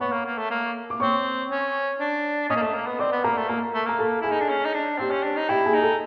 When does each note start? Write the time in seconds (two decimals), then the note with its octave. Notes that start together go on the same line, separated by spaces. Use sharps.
0.01 B3 C#5 C#6
0.13 A#3
0.26 A#3
0.38 A3
0.51 A#3
0.90 D6
1.00 C4 C#5 C#6
1.50 C#4
2.00 D4
2.49 C#4 D#5 D#6
2.56 A#3
2.62 A3
2.74 A#3
2.87 B3
2.99 C4 D5 D6
3.12 B3
3.24 A#3 A#4 A#5
3.37 A3
3.49 A#3 A#4 A#5
3.74 A3
3.86 A#3 A#5
3.99 A4 A5
4.21 E4 G#4 G#5
4.31 D#4
4.41 D4
4.49 C#4
4.65 D#4
4.74 D4
4.99 C4 G4 G5
5.11 C#4
5.24 D4
5.37 D#4
5.49 E4 G4 G5
5.66 G#4 G#5
5.74 D#4
5.82 A4 A5